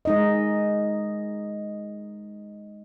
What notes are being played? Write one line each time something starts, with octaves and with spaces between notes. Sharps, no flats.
G#3 D#4 D#5